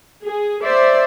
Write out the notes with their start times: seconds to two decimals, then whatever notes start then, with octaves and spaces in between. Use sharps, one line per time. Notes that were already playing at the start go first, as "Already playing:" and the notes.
0.23 G#4
0.63 C5 D5 E5